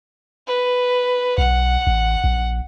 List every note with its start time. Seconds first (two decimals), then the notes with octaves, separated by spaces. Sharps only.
0.47 B4
1.38 B1 F#5
1.87 A1
2.24 A#1